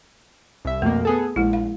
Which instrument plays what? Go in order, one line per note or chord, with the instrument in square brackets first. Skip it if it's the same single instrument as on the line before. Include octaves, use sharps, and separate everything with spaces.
[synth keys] C2 E5
[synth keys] F2 B2 A#3 [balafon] A3
[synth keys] B3 G#4 A4
[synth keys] A#1 [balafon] G#3 E4
[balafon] F5